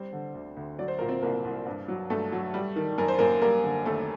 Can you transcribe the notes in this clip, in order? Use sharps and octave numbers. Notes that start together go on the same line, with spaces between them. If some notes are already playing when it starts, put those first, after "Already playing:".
Already playing: G3 C4 C5
D3
D2
D2
F#3 D5
C5
A#2 A#4
C4 C5
C2 A#3 A#4
C2
G2
F#3
G2 A3 A4
F#3
G3
D#3
F#2 A#4
C5
F#2 A#3 A#4
G3 A#3 A#4
D3
D#2 A3 A4